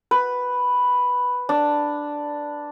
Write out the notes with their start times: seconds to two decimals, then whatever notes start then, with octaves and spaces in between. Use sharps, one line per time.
0.11 B4
1.49 D4